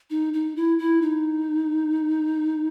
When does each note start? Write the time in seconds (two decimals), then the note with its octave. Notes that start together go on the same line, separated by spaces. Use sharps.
0.10 D#4
0.33 D#4
0.56 E4
0.79 E4
1.02 D#4